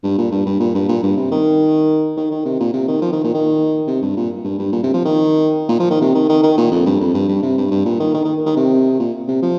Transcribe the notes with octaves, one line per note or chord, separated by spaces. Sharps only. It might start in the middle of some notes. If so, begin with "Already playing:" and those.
G2
A#2
G2
G2
A#2
G2
A#2
G2
C3
D#3
D#3
D#3
C3
A#2
C3
D#3
F3
D#3
A#2
D#3
C3
G2
A#2
G2
G2
A#2
C3
F3
D#3
A#2
F3
D#3
C3
D#3
D#3
D#3
A#2
F2
G2
F2
G2
G2
C3
G2
G2
A#2
D#3
D#3
D#3
D#3
C3
A#2
C3
F3